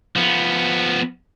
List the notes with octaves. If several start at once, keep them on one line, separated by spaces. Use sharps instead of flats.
F3 B3